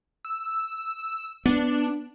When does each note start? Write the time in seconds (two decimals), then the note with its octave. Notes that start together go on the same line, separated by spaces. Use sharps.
0.25 E6
1.46 B3 D4